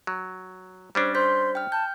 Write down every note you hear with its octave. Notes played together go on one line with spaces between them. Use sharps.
F#3
G3 C#4 D4 C5
C5 C6 G6 B6
G5 F6
A5 G6